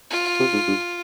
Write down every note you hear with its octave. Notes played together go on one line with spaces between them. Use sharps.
F4
C3
G#2
G2